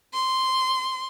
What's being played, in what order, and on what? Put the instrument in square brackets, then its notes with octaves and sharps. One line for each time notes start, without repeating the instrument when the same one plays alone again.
[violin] C6